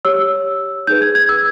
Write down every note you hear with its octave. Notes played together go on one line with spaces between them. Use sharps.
G4 C#5 E6
D#4 G#4 B4 G6
G#6
G#6
E6